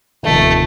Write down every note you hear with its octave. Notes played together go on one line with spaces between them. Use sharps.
F1 D#2 D#3 A3